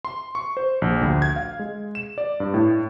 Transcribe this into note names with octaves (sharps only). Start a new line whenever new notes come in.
C6
C#6
C5
A#1
D2
G#6
F5
G#3
E7
D5
G2
A2